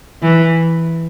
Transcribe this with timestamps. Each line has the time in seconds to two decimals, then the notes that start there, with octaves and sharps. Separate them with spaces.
0.22 E3